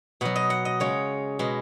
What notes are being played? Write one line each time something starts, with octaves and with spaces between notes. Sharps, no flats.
B2 F#3 F#5
D#5
F#5
D#5
C#3 G#3 C#5
B2 G#3